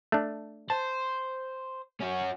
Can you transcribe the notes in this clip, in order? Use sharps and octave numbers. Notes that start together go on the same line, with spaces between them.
A3 D4
C5 A5
C#4 F#4